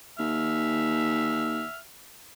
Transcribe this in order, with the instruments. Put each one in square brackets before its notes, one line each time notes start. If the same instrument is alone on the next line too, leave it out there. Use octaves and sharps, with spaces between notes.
[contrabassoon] D#2 [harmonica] E5 F6